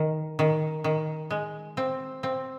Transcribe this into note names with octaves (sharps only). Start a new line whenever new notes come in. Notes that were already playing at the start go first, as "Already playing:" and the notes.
Already playing: D#3
D#3
D#3
G#3
C4
C4